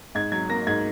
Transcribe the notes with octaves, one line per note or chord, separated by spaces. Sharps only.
G#2 G#6
F#3 G#6
A#3 A#6
G#2 G#6